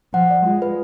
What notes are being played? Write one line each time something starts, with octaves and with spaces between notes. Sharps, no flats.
F3 F#5
D5
G#3 F4
B4